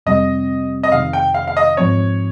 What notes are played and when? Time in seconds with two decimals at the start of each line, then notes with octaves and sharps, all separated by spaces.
0.06 F2 C3 G3 C4 D#5
0.83 D#5
0.92 F2 C3 D#3 F5
1.13 G5
1.34 F5
1.47 F5
1.57 D#5
1.77 G#2 F3 C4 C#5